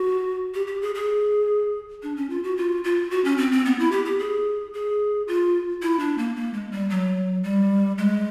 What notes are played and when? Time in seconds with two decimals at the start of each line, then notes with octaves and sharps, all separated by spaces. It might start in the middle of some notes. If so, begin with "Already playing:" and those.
Already playing: F#4
0.54 G4
0.67 G4
0.82 G#4
0.95 G#4
2.03 D4
2.17 C#4
2.30 F4
2.44 F#4
2.57 F4
2.84 F4
3.11 F#4
3.24 C#4
3.38 C4
3.52 C4
3.65 B3
3.79 E4
3.92 G4
4.05 G4
4.19 G#4
4.74 G#4
5.28 F4
5.82 E4
5.99 D4
6.18 A#3
6.36 A#3
6.53 G#3
6.72 G3
6.90 F#3
7.44 G3
7.98 G#3